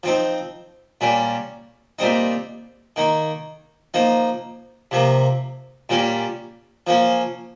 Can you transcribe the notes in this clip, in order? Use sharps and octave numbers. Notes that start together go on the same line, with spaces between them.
F3 C4 D#4
A#2 G3 C#4
A#2 G3 C4 D#4
D#3 A#3 D#4
F3 A#3 D#4
C3 F3 A#3
A#2 G3 C#4
F3 A#3 C#4